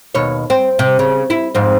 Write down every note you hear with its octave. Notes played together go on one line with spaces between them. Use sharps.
D#2 B2 C#5
C4
C3
C#3
E4
F2 G#2 C4